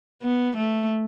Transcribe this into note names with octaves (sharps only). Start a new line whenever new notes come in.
B3
A3